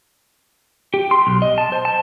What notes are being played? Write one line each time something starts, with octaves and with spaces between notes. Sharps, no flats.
G4
C6
B1
D#5
A5
C5
A5